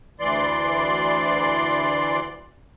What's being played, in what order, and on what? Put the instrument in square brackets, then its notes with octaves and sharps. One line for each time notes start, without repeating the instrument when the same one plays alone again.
[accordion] D2 E3 D5 C6